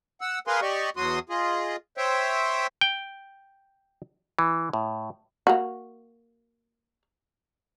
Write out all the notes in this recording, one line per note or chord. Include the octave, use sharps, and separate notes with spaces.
F#5 E6
G#4 A#4 B4 F5 G#5 C6
G4 D5 D#5 C#6
E2 F#3 F#4 C6 D#6
F4 G#4 D#5
C5 C#5 E5 G5
G5
E3
A2
A#3 F#4